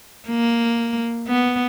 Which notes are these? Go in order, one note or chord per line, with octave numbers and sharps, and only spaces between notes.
A#3
B3